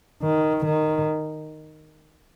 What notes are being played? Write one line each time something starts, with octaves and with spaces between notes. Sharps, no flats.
D#3
D#3